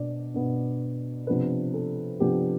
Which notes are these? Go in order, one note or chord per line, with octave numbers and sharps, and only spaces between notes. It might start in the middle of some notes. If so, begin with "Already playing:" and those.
Already playing: B2 B3 D4 D5
B2 B3 D4
C3 F3 B3 D4 B4
A4
C3 F3 B3 D4 G4